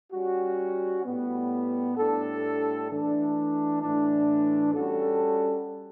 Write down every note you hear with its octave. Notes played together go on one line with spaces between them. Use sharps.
G3 C#4 F#4
A2 G3 B3
A2 G3 D4 A4
E3 A3 D4
A2 E3 A3 D4
G3 C#4 F#4 A4